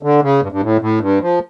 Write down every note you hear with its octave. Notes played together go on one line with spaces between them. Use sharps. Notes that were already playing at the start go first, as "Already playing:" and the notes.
D3
C#3
G2
G2
A2
A2
G2
F3